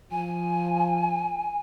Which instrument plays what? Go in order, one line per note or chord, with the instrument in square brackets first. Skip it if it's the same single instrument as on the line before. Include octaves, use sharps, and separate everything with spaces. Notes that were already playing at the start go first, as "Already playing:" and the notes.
[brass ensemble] F3 [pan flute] G#5